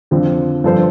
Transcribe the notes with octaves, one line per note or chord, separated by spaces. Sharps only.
F2 D3 F3 C4
G2 F3 D4 A4 C5